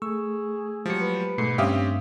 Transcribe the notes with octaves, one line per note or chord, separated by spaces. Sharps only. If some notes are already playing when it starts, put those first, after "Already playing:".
A3 G#4 C#6 E6
F3 F#3 G#3 G4 C#7
B4
G#2 B2 A3 C7 C#7
G2 A3 C4 C#4 G4 E5 F5 D#6